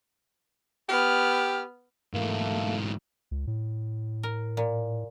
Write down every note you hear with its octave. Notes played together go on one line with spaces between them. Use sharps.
B3 G4 F6
G#2 E3 A3 A#3
C#2
A2
A#4
A#2